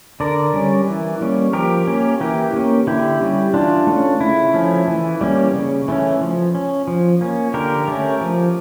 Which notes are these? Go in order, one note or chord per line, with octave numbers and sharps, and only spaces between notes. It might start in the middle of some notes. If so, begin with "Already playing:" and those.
D3 A#4 D5
G3 C#4
E3
G3 A#3 C#4
F3 G4 A#4
A#3 C#4
E3 G4 A#4
A#3 C#4
D3 E4 G4
G3 C#4
E3 D4 F4
A3 C#4
C#3 E4
F3 A3 C#4
E3
G3 A#3 C#4
C#3
E3 A3 C#4
F3
C#4
F3
A#3 C#4
D3 G4 A#4
A3 C#4
F3